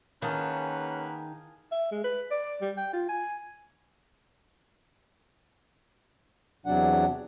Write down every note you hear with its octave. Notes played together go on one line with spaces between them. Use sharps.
D#3 A#3 C#4 G#4 B4 F5 F#5 A5
E5
G#3
B4
D5
G3
G5
F4
G#5
E2 C3 F#3 D4 F#5